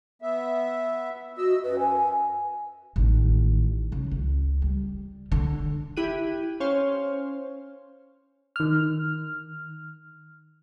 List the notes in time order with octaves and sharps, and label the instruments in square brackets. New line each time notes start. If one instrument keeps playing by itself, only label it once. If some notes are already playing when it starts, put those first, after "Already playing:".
[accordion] B3 E5
[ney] F#4 [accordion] D#5 E6
[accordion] F#2 [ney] B4
[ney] G#5
[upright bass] A1 D#3
C#3
C#2
G3
D3
[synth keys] E4 G4 F#6 D#7
C#4 C5 C#5 F5
[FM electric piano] D#3 F6